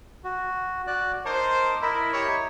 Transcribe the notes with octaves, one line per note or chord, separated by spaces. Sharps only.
F#4
F#4 D5 F#6
D#4 A#4 C5 A5 D6
E4 A#4 D#5 B5
E4 G4 C#5